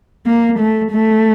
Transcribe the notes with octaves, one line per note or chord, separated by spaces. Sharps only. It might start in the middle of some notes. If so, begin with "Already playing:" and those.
A#3
A3
A3